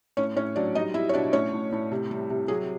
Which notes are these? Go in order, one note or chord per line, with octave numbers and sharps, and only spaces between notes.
A2 C#4 C#5
A2 C#4 C#5
F#3 D4 D5
G3 D#4 D#5
G3 E4 E5
C#5
B2 D4 D5
A2 C#4 C#5
A2
A2
C3
G3
C3
F#3 G#4